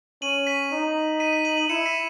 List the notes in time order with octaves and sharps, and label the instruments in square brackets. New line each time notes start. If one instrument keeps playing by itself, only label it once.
[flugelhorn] C#4 [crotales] D#7 F#7
[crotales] B6 D#7
[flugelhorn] D#4
[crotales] B6 D#7
B6 D#7
D#7 F#7
D#7 F#7
[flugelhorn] E4 [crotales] C#7 E7
[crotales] B6 D#7